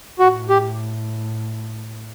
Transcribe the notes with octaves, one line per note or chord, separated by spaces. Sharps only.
A2 F#4
G4